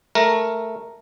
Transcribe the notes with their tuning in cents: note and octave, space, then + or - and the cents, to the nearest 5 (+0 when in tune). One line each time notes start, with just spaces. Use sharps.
A3 +0 A#4 +0